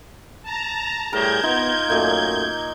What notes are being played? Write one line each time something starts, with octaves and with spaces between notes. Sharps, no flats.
A5 A#5
A2 G3 G#4 A#4 G6 G#6
B3 D#4 F4
F#2 A#2 A3 D#5